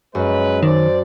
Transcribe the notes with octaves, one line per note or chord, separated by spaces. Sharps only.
F#2 G#3 C#4 B4
D#3 C5 D5